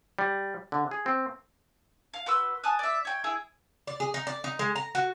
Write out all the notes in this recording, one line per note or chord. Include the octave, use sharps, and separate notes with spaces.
G3
D3
G#4
C4
F5
F#4 B4 C6 E6
G#5 A5 D#6 F#6
D5 E5
C#5 G5
E4 G#4 E6
D5
G#4
D#4
D5
D#4
G#3
A#5
F#4